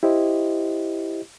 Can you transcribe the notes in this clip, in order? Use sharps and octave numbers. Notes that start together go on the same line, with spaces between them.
E4 G4 C5 D#5